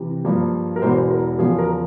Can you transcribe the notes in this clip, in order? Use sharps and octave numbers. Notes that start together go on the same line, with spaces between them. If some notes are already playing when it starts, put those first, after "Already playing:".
Already playing: C3 E3
G2 F3 A#3
A#4
E1 E2 E3 C5
A#4
E2 C#3 F3 G#4
A#4